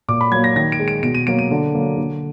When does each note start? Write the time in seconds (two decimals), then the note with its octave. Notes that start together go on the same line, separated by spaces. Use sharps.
0.08 A#2 D6
0.21 B5
0.32 F#3 A#3 G#6
0.44 A#6
0.56 D#3 A#6
0.72 D7
0.80 G#3
0.88 D7
1.03 B2 D7
1.14 D#7
1.27 F#3 A#3 D7
1.39 D#7
1.51 D3
1.75 F#3 A#3
1.98 D3